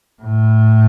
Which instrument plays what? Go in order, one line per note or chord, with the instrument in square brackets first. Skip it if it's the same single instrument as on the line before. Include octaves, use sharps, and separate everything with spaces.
[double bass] A2